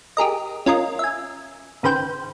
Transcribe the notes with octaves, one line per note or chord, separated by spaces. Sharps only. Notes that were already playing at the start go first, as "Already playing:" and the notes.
G4 G#4 A#4 D#5
C#4 F4 A#4 D#5
E5 G#5
G#1 C#3 B4 C5 G5